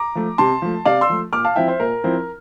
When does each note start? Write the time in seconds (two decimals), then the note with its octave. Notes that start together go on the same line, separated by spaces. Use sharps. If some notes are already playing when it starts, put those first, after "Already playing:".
Already playing: A#5 D6
0.15 F3 A3
0.38 C3 A5 C6
0.62 F3 A3
0.85 C3 D5 F5
1.01 C6 E6
1.09 F3 A3
1.32 A#2 D6 F6
1.45 F5 A5
1.56 F3 C4 E4 E5 G5
1.68 C5 E5
1.80 A#2 A#4
2.04 F3 C4 E4